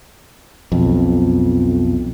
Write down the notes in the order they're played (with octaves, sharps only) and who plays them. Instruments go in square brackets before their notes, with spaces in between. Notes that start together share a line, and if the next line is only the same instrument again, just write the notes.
[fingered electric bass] B1 F2